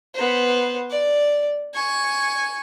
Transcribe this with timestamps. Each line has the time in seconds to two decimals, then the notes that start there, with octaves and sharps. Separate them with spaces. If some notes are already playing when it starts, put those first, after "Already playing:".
0.14 B3 C5
0.90 D5
1.74 G#5 C#6